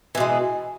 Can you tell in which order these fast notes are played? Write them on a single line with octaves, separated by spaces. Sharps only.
E3 B2 G#3